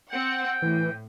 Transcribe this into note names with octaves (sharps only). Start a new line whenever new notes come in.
C4 F#5 G5
A2 E3